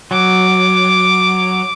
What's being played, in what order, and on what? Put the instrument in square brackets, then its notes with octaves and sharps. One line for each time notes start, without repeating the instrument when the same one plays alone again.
[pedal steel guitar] F#3 [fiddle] D6